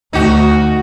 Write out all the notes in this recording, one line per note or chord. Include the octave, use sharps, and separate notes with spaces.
D2 D#4 F#4